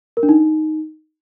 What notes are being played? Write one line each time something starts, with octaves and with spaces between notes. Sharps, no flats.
A#4
D4
D#4